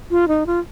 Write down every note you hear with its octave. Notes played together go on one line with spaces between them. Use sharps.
F4
D#4
F4